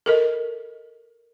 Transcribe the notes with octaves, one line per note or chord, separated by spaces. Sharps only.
A4 A#4 D#5